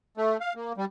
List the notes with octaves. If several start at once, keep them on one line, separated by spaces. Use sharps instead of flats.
A3
F5
A#3
G3